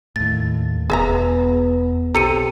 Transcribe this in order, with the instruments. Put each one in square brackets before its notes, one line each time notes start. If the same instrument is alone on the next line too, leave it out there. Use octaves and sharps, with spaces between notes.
[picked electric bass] D#2 A2 [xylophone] A6
[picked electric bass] E1 [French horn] B3 [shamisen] G#4 E5 A#5
[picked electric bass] B1 [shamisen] C4 A4 A#5 [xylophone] G4 C#7 D#7